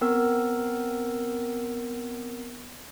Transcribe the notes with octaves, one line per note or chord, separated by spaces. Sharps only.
B3 C4 A#4 E6